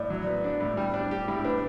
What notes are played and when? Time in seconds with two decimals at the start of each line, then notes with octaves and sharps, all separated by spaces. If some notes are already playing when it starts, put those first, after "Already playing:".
Already playing: A2 D5
0.10 F#3
0.27 B3
0.44 D4
0.60 A2
0.77 G3
0.94 D4
1.11 G4
1.28 A2
1.44 D4 B4